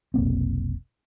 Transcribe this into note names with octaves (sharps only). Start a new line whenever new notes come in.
F1 B1 A#3 C4